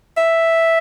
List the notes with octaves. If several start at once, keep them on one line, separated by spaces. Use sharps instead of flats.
E5